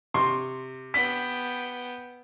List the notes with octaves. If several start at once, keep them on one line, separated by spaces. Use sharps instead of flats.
C3 C6 C#6
B3 G5 B6